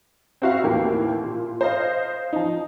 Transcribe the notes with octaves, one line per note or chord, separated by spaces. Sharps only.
C4 E4 F#4 E5 F5
D#2 A2 E3 A#3 G4
A#2
C5 D#5 F5
F3 D#4